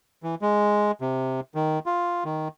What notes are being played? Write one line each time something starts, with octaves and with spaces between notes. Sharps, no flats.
E3
G#3
C3
D#3
F4
D#3